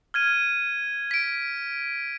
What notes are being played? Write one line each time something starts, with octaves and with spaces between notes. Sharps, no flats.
F6 G#6 D#7
B6 D7